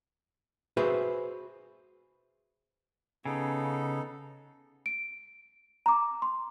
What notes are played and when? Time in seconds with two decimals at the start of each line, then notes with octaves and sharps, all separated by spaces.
0.77 F#4 G#4 B4 C5 E5
3.25 C#3 B3 D#4 A4
4.86 D7
5.86 A#5 D6
6.22 C6